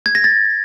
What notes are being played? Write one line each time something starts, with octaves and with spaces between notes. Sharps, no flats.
G#6
A#6
A6